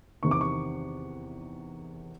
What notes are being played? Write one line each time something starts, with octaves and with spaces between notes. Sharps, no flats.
E2 C3 D#3 C#6
D6
C#6